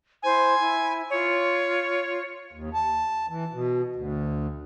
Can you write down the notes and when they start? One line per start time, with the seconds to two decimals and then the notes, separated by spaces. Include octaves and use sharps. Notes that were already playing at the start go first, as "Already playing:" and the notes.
0.23 E4 C5 G#5
0.58 E4
1.10 F4 C#5
2.53 D#2
2.74 A5
3.29 E3
3.53 B2
3.96 D2